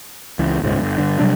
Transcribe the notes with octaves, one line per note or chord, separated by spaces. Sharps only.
C#2 E3
D#1 C#2 G#2
G1
G2 D3
C3 F#3 G3 D4